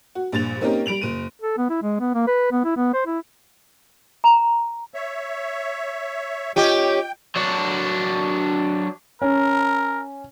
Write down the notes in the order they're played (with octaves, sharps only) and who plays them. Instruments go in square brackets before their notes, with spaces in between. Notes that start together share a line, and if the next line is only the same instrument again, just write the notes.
[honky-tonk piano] F#4
A#1 G2 A6 F7
A#3 C4 C#4 D#4 G4 A#4
G3 D7 F7 F#7
F#1 D#7
[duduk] A4
B3
E4
G#3
B3
A#3
B4
B3
E4
B3
C5
E4
[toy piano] A#5
[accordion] C#5 E5
[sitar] C#4 G4 [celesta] F4 D#5 D6 [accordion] G5
[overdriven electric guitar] F#3 D4
[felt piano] C#4 [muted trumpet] A#4